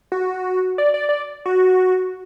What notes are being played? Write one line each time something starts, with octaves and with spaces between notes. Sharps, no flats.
F#4
D5
D5
D5
F#4